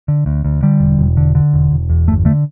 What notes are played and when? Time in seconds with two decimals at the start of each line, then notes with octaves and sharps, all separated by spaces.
0.08 D3
0.26 D2
0.45 D2
0.63 D3 G3
0.80 E1
0.99 E1
1.17 D3
1.35 D3
1.54 E1
1.71 E1
1.89 E2
2.08 G1 A3
2.25 D3 A3